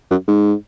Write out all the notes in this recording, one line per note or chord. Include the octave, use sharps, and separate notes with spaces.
F#2
G#2